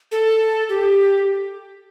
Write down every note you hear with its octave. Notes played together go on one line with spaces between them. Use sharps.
A4
G4